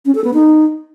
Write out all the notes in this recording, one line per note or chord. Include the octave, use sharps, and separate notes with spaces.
C#4
A4
B3
D#4